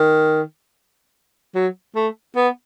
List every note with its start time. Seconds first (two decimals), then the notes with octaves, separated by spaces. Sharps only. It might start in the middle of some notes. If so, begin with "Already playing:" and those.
Already playing: D#3
1.55 F#3
1.95 A3
2.36 B3